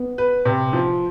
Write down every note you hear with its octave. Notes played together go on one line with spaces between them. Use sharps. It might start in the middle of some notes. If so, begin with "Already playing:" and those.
Already playing: B3
B4
C3
F3